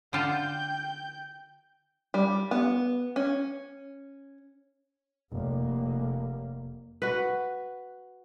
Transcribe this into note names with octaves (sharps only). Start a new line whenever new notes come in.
D3 F4 G5 A5 G6
G3
B3
C#4
F1 A#3
F#4 B4